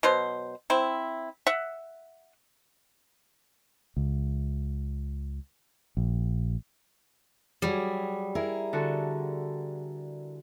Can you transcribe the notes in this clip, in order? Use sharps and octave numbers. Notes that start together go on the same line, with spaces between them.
B2 F#3 C5
C4 E4
E5 F#5
C#2
A#1
F#3 G3 G#4
E4 G#4 A#4
D3 F#4 A4